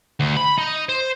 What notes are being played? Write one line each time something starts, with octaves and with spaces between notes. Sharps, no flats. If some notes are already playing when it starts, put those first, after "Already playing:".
D2
B5
D#4
C5